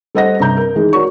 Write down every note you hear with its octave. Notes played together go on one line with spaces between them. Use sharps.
G3 A4 C5 D#5 F#5 A#6
G2 C3 A#5 G6
A#4
D#3 E3 G#3
F#4 A#4 C#5 D5 C#6